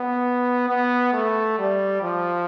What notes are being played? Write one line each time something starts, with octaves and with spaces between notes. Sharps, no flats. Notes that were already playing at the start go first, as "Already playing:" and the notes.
Already playing: B3
B3
A3
G3
F3